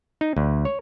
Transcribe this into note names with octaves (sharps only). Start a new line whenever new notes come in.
D#4
D2
C#5